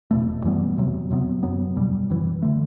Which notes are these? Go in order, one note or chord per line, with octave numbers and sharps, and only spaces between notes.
E1 E2 B2 A3
F#2 E3 G3 B3
E2 C3 F#3
E2 C3 F#3 B3
F#1 F#2 F#3 B3
F#1 E2 B2 G3
F#1 F#2 E3
D3 A3